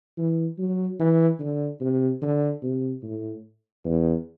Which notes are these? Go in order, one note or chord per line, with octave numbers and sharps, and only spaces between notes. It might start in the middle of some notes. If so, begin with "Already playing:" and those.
E3
F#3
E3
D3
C3
D3
C3
A2
E2